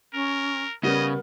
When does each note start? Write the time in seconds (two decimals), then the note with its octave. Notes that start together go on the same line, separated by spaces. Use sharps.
0.14 C#4 A#4
0.83 C#3 G3 B3 A#4 D#5